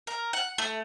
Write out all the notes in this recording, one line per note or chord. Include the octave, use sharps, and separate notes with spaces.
A#4
F#5
A3